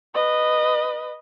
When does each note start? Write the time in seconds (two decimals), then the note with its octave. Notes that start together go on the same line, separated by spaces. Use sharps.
0.14 B4 D#5